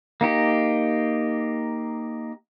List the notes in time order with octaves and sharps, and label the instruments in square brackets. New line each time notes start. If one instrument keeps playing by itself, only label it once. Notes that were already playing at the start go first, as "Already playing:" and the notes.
[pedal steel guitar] A#3 D#4 G4